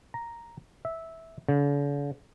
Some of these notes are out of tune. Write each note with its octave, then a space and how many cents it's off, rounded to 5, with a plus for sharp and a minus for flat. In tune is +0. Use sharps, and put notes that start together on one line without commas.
A#5 +0
E5 -10
D3 -45